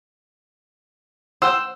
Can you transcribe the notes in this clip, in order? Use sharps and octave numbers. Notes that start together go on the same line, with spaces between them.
C5 F#5 G5 E6